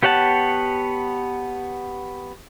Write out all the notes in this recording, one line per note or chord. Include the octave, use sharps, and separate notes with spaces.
B3 G4 C#5 F#5 A5